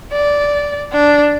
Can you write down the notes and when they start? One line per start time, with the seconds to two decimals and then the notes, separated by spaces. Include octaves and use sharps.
0.12 D5
0.92 D4